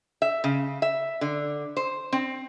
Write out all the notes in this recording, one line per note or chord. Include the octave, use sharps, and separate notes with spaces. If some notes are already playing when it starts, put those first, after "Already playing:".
E5
C#3
E5
D3
C5
C4